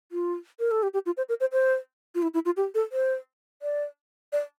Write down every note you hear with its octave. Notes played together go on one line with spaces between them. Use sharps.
F4
A#4
A4
G4
G4
F4
C5
A#4
C5
C5
F4
E4
E4
F4
G4
A4
C5
D5
D5